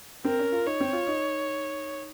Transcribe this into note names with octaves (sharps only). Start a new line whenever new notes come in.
C4 A#4
C#4
F4
D#4 C#5
C4
F4
D#4